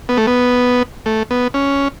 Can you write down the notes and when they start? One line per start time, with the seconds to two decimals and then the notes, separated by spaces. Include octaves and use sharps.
0.09 B3
0.17 A3
0.27 B3
1.06 A3
1.31 B3
1.54 C#4